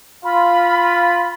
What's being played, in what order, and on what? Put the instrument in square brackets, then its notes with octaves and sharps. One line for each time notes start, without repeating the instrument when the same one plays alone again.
[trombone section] F4 [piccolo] B5